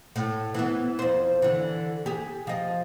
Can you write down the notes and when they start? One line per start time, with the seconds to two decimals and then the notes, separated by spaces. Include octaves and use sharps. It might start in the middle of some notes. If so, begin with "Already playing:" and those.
0.16 A2
0.54 E3 B3
0.99 F2 C5
1.42 D3 E3
2.06 G4 G#4
2.47 F3 D#5